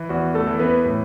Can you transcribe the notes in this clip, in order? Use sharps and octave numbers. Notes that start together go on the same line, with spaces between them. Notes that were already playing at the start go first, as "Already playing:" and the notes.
Already playing: E3
E2 F#4
A3 A4
E3
B3 B4
A2